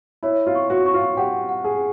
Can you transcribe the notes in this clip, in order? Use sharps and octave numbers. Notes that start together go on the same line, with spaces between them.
E4 C#5
F4
C#6
F#4
C#6
F4
G4 F#5
F#5
G#4